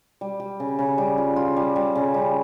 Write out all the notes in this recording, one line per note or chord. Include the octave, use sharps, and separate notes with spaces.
G3
G3
C#3
C#3
G3
F4
F4
G3
G3
C#3
G3